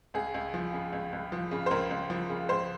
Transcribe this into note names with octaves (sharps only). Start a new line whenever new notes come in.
C#2 G#4
C#2
F3
C#3
C#2
C#2
F3
C#3
C5
C#2 A#4
C#2
F3
C#3
C#2 C5